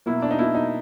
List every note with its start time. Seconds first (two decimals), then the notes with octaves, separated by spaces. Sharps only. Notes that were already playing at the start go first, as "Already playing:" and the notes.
0.06 B2 F#3 A#3 E4
0.22 D4
0.31 D#4
0.39 B2 F#3 A#3 E4
0.55 D#4